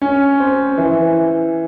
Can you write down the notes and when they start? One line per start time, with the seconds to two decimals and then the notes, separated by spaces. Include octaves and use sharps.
0.02 C#4
0.40 C4
0.78 E3